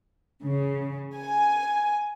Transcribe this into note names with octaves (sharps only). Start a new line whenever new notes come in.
C#3
G#5